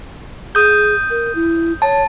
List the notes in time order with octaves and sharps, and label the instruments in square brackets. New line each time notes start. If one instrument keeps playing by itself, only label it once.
[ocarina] G#4 [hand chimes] D#6 G6
[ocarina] A#4
E4
[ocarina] C#5 [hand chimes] A5